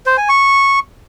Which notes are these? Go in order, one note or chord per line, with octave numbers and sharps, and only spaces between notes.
C5
G#5
C#6